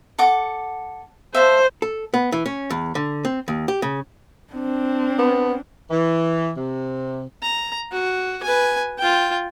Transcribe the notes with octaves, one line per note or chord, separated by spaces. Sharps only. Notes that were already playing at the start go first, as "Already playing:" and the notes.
A4 F#5 D6
C5 E5 F5 A5
A4
B3
E3
C#4
E2
D3
C4
D#2
G4
C#3
C4 D4
B3
E3
C3
A#5
F#4
B4 G#5
F4 G5